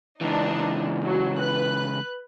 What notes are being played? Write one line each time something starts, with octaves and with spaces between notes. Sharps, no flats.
C#2 E3 D4 D#4
F#3
B4 F#6